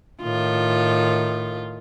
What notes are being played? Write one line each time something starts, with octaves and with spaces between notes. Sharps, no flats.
A2 D#3 F4